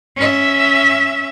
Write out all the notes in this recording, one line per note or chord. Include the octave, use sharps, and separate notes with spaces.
C#4 E5